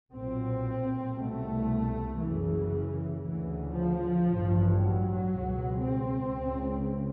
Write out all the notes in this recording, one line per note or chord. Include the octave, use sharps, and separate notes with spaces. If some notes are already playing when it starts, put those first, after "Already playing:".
B1 A#2 C4
C2 B2 A3
F#1 F#2 C#3 E3
D2 C#3 E3
F3
A1 G2
F#3
C#2 B2
C4
C#2 C#3